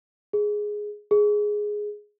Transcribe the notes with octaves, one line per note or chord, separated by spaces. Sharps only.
G#4
G#4